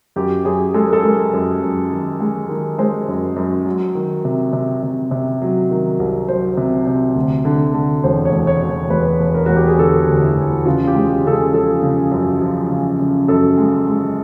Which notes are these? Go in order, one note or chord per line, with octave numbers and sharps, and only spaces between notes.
F#2 G4
F#2 G#4
G#3 A4
A#4
A4
G#3 A#4
F#2
F#2
D#3
G#3
D#3
G#3 C5
F#2
F#2
F#3
D#3
C3
C3
C3
C3
F#3
D#3
C2
F#3 C5
C3
C3
D2
D3
D3
E1 C5
C#5
E1
C#5
E1
C#5
E1 B4
E1
A#4
E1 F#4
G4
G#4
D3 A4
D2
E4
E1
C#3 F4
G4
G#3
G4
C#3 A4
G#4
F3 A4
C#3
F#2
F3
C#3
C#3
F#2 A4
G#3
G#3